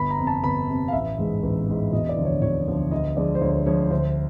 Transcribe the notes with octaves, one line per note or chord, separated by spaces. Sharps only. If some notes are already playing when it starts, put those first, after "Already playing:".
Already playing: G1 B5
A#5
F2 C3
A5
G1 B5
F2 C3
F5
A1 E5
G#2 E3 G#3
A1
G#2 E3 G#3
E1 D#5
D5
D2 D3 F3
C#5
E1 C#5
D2 D3 F3
D2 D#5
D3 F3 G#3 D5
C5
D2 C#5
D3 F3 G#3 C#5
D2 C5